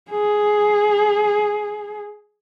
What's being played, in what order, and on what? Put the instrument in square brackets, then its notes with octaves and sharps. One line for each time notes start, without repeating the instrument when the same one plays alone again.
[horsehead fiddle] G#4